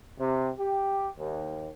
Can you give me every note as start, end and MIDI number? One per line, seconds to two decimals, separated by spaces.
0.19 0.51 48
0.59 1.09 67
1.19 1.70 39